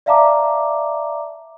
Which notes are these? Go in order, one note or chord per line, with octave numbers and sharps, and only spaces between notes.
D5 E5 F5 A5 A#5 D6